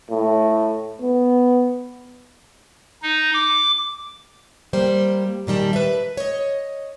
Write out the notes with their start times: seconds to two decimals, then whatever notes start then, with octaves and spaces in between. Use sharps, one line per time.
0.11 A2
1.02 B3
3.02 D#4
3.34 D6
4.73 G3 A#3 G4 C5
5.47 A#2 D#3 G3 A5
5.73 B4 E5
6.17 C#5 D#5